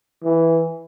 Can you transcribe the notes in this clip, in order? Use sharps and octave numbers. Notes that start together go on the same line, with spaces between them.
E3